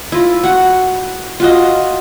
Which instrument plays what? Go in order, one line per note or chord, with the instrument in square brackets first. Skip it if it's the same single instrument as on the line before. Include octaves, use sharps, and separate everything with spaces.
[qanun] E4 F4
F#4 F#5
F4 F#4 D#5